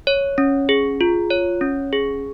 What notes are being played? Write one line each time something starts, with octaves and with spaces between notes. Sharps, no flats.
C#5
C#4
G#4
F4
C#5
C#4
G#4